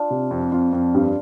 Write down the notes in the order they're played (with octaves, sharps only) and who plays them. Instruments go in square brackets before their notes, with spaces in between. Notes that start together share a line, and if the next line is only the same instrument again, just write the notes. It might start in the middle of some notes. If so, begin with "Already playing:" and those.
Already playing: [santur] D4 F4
[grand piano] C3
F2
[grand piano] F2 [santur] F4
[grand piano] F2
G2